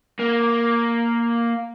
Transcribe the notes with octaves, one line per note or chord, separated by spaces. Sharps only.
A#3